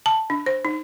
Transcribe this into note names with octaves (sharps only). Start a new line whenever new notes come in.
A5
D4
C5
D#4